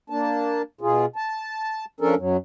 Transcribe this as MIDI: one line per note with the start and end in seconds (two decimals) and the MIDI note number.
0.10 0.62 58
0.10 0.62 62
0.10 0.62 81
0.81 1.06 47
0.81 1.06 65
0.81 1.06 68
1.16 1.85 81
2.00 2.15 53
2.00 2.15 61
2.00 2.15 62
2.00 2.15 69
2.00 2.15 70
2.17 2.37 42
2.17 2.37 54